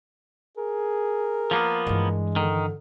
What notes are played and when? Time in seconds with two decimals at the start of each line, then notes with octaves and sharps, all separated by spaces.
0.57 G#4 A#4
1.51 F3 A#3 B3
1.87 G2 E3 G#3
2.36 D3 D#3